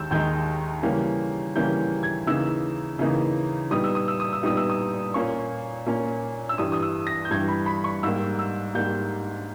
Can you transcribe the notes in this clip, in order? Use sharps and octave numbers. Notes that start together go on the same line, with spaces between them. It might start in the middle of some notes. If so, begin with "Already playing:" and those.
Already playing: D#2 D#3 G#3 E6 G6
D#2 D#3 G#3 D#4 G6
C#3 E3 G3 A#3 C#4
C#3 E3 G3 A#3 C#4 G6
G#6
C#3 E3 A#3 D#4 E6
C#3 E3 A#3 D#4
A#2 G3 B3 D#4 D#6
E6
D#6
E6
D#6
E6
A#2 G3 B3 D#4 D#6
E6
D#6
A#2 A#3 C#4 C#6
A#2 A#3 C#4
E6
G2 E3 G3 D#6
D#6
E6
A#6
G6
G2 E3 G3 G#6
B5
B5
C#6
G#2 G3 A#3 E6
E6
G#2 G3 A#3 G6